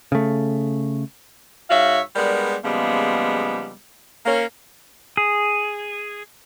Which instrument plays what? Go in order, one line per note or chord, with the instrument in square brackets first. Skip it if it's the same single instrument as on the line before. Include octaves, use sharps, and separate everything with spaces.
[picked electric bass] C#3 A3
[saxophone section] G#2 F#4 C#5 E5 F5
G3 G#3 B3 D4 A#4 D5
C#3 F3 G3 G#3 A#3 B3
A#3 C#4 A#4
[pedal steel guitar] G#4